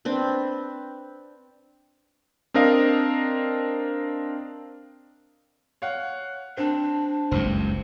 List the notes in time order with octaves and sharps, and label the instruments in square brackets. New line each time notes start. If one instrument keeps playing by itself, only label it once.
[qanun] C4 D4 B4
[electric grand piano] C4 D4 A#4 D#5 F5
[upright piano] C#5 F5 F#5
[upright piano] C4 [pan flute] D4
[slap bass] F#1 C#2 G2 [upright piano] C4